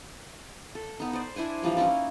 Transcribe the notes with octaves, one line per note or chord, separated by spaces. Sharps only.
A4
B3 D#4
C5 D5
D4 E4 C5 G#5
E3 F3 G3 A#3
C#4 D#4 E4 D5